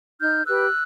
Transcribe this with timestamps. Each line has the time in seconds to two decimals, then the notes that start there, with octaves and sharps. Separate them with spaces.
0.21 D#4 F6 G6
0.46 G4 B4 E6 F#6